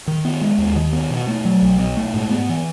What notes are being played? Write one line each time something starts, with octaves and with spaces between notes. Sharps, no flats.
D#3
B3
G#3
D#2
D#3
B3
B2
A3
F#3
B1
B2
A3
G#2
B3
E3